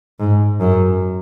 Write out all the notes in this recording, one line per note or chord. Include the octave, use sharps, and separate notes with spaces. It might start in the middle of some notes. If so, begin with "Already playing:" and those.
G#2
F#2